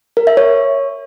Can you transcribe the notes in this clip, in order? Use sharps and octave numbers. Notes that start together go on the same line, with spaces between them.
A#4
E5
C#5